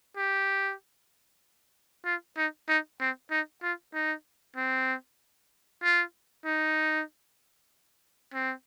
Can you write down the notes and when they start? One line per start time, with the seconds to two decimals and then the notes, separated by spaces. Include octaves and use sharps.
0.17 G4
2.05 F4
2.37 D#4
2.69 D#4
3.00 C4
3.31 D#4
3.63 F4
3.94 D#4
4.56 C4
5.83 F4
6.45 D#4
8.34 C4